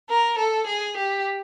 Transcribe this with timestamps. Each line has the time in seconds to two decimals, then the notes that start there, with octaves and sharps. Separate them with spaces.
0.09 A#4
0.38 A4
0.67 G#4
0.95 G4